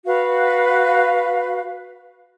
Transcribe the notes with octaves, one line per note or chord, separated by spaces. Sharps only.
F#4 B4 F5